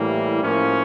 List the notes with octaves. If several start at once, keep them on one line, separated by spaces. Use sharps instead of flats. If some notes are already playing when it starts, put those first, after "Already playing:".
Already playing: A2 E3 G3 A#3
A2 F3 A#3 C#4